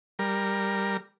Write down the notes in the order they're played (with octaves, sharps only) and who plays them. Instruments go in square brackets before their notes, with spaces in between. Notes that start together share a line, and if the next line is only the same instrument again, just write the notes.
[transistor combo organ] G3 A#4